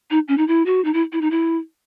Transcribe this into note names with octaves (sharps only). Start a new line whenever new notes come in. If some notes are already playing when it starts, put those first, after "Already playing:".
D#4
C#4
D#4
E4
F#4
D#4
E4
E4
D#4
E4